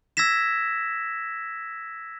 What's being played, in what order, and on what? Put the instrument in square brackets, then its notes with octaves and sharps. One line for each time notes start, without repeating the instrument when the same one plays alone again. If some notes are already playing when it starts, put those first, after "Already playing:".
[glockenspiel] E6 G#6 A#6 B6 E7